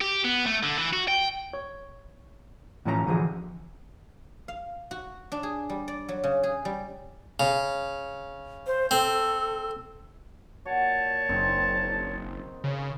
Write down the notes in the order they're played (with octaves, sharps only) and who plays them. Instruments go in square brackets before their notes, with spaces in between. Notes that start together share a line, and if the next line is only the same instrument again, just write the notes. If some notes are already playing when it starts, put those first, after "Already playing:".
[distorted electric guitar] G4
B3
A3
D3
E3
F#4
G5
[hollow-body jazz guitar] C#5
A2 E3 F3 C#4 G#4 A#5
D3 E3 F3 F#4 G#4
[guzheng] F5
F#4
D4
G#4
G3
D5
F#3
C#3
G#4
G3
[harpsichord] C#3
[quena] C5
[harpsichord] C4 [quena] A4
[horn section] A#2 C#5 A5 [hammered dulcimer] F#4
[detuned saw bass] F#1 [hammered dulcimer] D#3 C4 D#4
[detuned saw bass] C#3